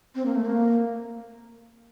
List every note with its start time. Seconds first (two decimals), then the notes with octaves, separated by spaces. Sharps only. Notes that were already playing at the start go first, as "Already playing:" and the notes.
0.15 C4
0.26 A#3
0.35 A3
0.45 A#3